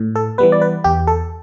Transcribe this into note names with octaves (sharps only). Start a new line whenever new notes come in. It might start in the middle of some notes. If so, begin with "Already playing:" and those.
Already playing: A2
A4
E3 G3 B3 B4
D5
B4
E2 G4
A4